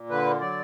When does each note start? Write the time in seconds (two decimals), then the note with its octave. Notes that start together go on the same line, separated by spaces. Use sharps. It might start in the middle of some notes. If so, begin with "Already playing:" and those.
Already playing: A#2
0.09 D3 B4
0.41 F#3 D5